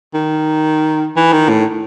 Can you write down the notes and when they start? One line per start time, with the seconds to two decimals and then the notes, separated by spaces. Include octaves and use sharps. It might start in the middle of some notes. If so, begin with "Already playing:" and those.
0.14 D#3
1.16 E3
1.32 D#3
1.49 A2